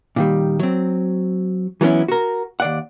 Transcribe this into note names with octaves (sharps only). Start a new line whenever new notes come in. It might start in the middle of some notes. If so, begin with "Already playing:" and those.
A#2 D#3 G3
F#3 C4
E3 F#3 B3 C#4 E4
F#4 A#4
D#2 D5 F#5